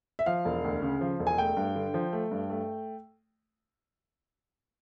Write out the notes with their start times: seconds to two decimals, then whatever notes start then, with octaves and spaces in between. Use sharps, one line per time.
0.19 E5
0.26 F3 F5
0.45 E1
0.64 D2
0.82 C#3
1.01 F3
1.20 E1
1.27 G#5
1.38 A3 G5
1.57 G2
1.75 D3
1.94 F3
2.13 A3
2.31 G2
2.50 A3